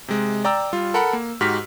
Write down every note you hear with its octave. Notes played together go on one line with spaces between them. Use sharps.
C3 G#3
D5 G5 A#5 D6 E6
G3 F4
A4 A#4 F#5 B5
A#3
G#2 F#4 G4 F6 B6